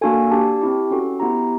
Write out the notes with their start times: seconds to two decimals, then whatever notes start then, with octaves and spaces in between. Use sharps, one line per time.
0.01 A#3 D4 F#4 A4 G#5
0.31 D4 G4 A5
0.61 C4 E4 G4
0.91 C#4 F#4 A4
1.20 B3 E4 G4 A#5